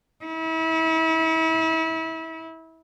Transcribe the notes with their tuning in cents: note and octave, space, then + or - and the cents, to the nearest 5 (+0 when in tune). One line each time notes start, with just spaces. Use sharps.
E4 -35